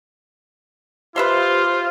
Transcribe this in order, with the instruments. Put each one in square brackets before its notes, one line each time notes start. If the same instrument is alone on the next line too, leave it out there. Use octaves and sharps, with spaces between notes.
[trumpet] F4 [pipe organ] G4 C6 [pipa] B4 E5 F5 [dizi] C5